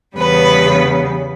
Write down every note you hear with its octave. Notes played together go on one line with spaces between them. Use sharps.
E2 C#3 G3 B3 B4